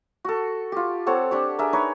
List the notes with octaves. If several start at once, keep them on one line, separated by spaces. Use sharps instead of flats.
F#4 A4
F4 G4
C4 A4 C#5 F#5
D4 G4 C#5
D4 G#4 A#4 E5
D#4 B4 C#5